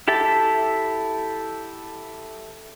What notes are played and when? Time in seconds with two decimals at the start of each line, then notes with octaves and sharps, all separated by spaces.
0.08 E4 G4 A4 E5 A5